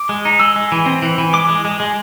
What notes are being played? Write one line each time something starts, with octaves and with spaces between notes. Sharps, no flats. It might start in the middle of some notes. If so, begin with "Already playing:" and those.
Already playing: D6
G#3
D#4
G#3 E6
G#3
E3
C4
E3
E3
G#3 D6
G#3
G#3
G#3